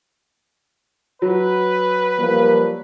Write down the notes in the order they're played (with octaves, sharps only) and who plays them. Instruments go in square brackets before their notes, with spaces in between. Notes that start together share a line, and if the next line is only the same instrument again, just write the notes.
[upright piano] F#3 [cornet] B4
[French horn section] F3 G3 A#3